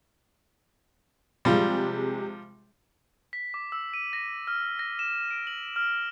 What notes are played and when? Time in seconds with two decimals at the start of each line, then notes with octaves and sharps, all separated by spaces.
1.45 C3 F3 G3 G#3
3.33 B6
3.54 D6
3.72 E6
3.94 D#7
4.13 A#6
4.47 F6
4.79 A#6
4.99 E7
5.31 D7
5.47 F#7
5.76 F6